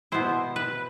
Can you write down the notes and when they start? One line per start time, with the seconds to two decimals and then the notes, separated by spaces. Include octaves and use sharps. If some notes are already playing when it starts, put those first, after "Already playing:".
0.12 B2 B3 E4 C5
0.56 B4